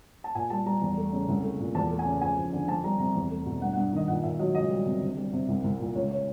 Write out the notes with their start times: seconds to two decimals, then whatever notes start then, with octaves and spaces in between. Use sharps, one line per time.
0.24 A5
0.35 A#2 G#5
0.50 G3 A5
0.66 G3 A#5
0.82 E2
0.97 A3
1.13 C#3
1.28 C2
1.44 A3
1.60 A#2
1.75 E2 A5
1.91 A3
1.99 G#5
2.06 C#3
2.21 F2 G#5
2.37 F2
2.53 D3
2.68 F2 A5
2.84 G3 A#5
2.99 C3 A#5
3.15 E2
3.31 A3
3.46 B2
3.61 G2 F#5
3.73 F#5
3.77 G2
3.93 D#3 D#5
4.08 A#2 F#5
4.24 A#2 E5
4.39 F#3 D#5
4.55 C#2 D#5
4.71 G3
4.86 C3
5.01 D2
5.17 G3
5.33 C3
5.48 C2
5.64 C2
5.80 A#2
5.95 C#2 C#5
6.11 C#5